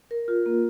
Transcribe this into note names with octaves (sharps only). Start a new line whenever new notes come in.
A#4
F4
A#3